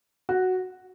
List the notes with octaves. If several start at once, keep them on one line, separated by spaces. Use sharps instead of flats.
F#4